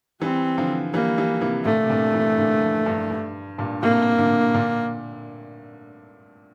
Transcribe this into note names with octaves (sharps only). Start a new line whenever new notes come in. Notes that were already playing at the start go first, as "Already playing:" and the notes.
E3 G3 C4
D3 F3
E3 G3 A#3
E3 G3
C3 E3
A#2 D3 A3
C3
G2 A#2
C3 E3
A#2 D3
F2
G2
G2
G2 A#2
A2 C3 A#3
A#2 D3
A#2 D3